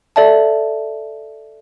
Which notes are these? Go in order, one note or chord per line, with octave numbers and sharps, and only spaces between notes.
A4 D5 E5 A5